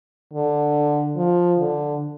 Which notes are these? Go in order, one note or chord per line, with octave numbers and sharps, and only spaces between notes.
D3
F3
D3